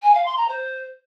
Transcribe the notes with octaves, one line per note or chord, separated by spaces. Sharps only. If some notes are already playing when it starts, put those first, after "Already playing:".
G#5
F5
C6
A#5
C5